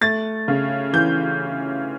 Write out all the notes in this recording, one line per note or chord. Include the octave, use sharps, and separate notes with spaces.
A3 A6
C#3
E3 G6